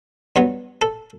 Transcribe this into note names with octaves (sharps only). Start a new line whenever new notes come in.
G2 F#3 B3
A4